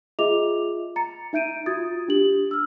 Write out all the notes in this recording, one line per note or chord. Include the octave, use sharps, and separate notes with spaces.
F4 G#4 D#5 E5 D6 F7
A#5 A6 C#7
D#4 E5 G6 D7 D#7
F4 F#4 D#6 G#6 A6
D4 G4 F#7
E6 F6